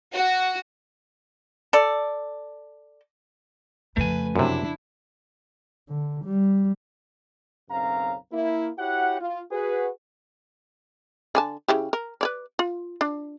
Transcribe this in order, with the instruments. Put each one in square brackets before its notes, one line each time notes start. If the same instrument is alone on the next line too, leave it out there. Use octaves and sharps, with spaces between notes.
[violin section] F#4
[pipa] A4 D5
[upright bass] F2 C#3 [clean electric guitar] A3 G#5 [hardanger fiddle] B4
[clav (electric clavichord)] F#2 C3 [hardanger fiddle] D4 E4
[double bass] D3
G3
[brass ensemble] B1 F#2 C#3 C4 F5 A#5
A#3 E4
E4 F#4 G4 C#5 F#5
F4
F#4 G#4 B4
[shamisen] D3 G#5 A5
C#3 E4 G4
A#4
B4 C#5 D5
F4
D4